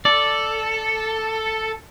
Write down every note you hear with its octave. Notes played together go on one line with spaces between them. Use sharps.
A4 D5